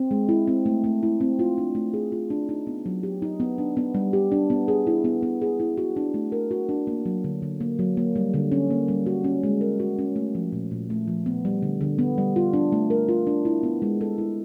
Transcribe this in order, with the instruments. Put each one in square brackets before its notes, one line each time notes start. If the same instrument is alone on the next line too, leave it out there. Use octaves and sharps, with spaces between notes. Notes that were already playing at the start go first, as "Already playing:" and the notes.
Already playing: [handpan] C4
G#3
E4
C4
A3
A3
E4
C4
F4
D4
A3
G#4
F4
D4
D#4
B3
F#3
G4
D#4
B3
D4
B3
G3
G4
D4
B3
G#4
E4
B3
B3
G#4
E4
F#4
D4
A3
A#4
F#4
D4
A#3
F#3
D3
D3
A#3
F#3
A#3
G3
D3
C#4
A#3
G3
F#4
C#4
G#3
A#4
F#4
C#4
A3
F3
A#2
A#2
A3
F3
B3
G3
D3
D3
B3
G3
F4
D4
A3
A#4
F4
D4
E4
B3
G#3
A4
E4